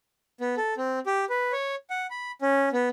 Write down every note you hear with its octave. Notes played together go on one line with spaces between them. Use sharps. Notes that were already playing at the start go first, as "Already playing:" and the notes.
B3
A4
C4
G4
B4
C#5
F#5
B5
C#4
B3